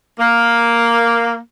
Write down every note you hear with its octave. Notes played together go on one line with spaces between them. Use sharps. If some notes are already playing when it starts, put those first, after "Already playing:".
A#3